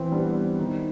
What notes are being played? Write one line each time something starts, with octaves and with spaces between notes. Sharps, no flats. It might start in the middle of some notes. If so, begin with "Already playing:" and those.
Already playing: E3 C4
G3 B3 D4
D#3